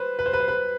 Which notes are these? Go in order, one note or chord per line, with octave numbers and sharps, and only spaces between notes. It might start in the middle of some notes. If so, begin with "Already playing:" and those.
Already playing: B4 C5
B4
C5
B4
C5
B4